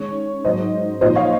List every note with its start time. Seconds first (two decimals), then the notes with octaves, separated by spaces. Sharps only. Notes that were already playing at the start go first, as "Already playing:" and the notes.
Already playing: D#3 G#3 C#4 C#5
0.44 G#2 F#3 C#4 C5 D#5
1.01 A#2 F3 C4 D#4 C5 D#5
1.15 C#5 F5